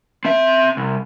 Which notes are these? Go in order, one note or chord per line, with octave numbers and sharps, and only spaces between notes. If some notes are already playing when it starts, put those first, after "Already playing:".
C4 E5
C2